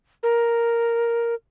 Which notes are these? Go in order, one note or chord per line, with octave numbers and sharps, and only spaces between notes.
A#4